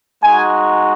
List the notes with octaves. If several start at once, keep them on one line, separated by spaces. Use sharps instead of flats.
G#3 D#4 F#4 G#5